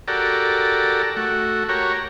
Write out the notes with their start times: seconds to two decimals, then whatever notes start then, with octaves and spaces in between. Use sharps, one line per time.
0.08 F#4 G4 A4 A#4 D5
1.16 A3 F#4
1.69 F#4 G4 A#4 C#5